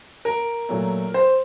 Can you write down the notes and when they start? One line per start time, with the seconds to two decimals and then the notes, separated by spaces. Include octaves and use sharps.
0.25 A#4
0.69 A#2 F#3 A3
1.14 C5